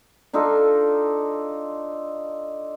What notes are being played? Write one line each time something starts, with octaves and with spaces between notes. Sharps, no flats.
D4 D#4 F4 A4